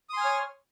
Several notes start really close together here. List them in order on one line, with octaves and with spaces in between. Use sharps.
D#6 C6 G#5 F6 C#5